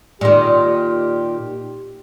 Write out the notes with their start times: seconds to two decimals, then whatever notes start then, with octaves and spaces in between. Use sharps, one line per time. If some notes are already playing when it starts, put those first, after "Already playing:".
0.21 A#2 D#3 G4